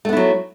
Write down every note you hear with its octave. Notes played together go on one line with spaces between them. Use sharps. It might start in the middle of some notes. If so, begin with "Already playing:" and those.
F#3 A3 B3 E4